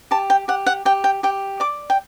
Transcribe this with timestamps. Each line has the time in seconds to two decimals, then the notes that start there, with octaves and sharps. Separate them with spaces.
0.11 G4 A5
0.30 G5
0.48 G4 F#5
0.66 F#5
0.85 G4 G5
1.04 G5
1.23 G4 G5
1.60 D5 D6
1.90 G5